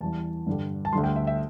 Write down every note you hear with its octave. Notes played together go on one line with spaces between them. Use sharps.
E2 E3 G3 A5
G2 D3 G3
A5
D2 D3 G3 C6
G5
E5
E5